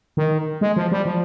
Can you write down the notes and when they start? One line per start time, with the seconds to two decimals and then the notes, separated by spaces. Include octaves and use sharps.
0.17 D#3
0.61 G#3
0.76 F3
0.92 G3
1.06 F3